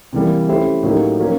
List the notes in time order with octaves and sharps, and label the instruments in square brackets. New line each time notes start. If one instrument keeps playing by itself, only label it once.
[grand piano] C3 E3 G3 A#3
A3 C#4 E4 G4 C5
A2 F#3 A#3 D#4 G4
F#3 A#3 C#4